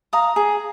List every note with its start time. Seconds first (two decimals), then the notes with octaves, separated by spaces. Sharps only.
0.13 F5 A#5 D#6
0.36 G#4